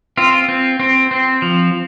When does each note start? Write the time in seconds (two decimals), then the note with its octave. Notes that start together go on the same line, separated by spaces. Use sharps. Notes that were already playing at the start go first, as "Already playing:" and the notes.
0.17 C4 F4
0.49 C4
0.80 C4
1.11 C4
1.42 F3